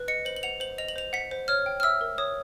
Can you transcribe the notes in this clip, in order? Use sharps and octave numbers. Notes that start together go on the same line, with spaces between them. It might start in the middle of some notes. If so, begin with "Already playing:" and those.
Already playing: B4
D#5 C#7
C5 F#7
F#7
F#5 F7
C5 F#7
D#5 F7
F#7
C5 F7
F#5 B6
C5
C#5 F6
G5
F6
E5 E6
A#4
C#5 D#6